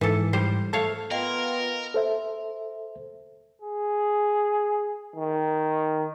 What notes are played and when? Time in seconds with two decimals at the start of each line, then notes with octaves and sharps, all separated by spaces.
0.01 G#2 E3 A4
0.33 G3 C5
0.73 A3 C#5 F5 A5
1.11 B3 F4 A#4 D#5 F5 G5
1.94 A4 C5 E5
3.62 G#4
5.16 D#3